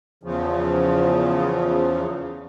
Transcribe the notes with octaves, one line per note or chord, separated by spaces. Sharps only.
E2 C#3 F3